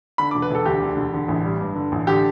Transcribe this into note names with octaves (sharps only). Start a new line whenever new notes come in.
D3 B5
D6
E1
B4
E1 A4
D2 G4
D3
E1
D3
A1
G3
G2
D3
A1
D3 G4